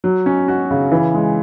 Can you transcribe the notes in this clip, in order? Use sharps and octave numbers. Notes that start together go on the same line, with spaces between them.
F#3
C#4
F#4
C#3
E3
G#3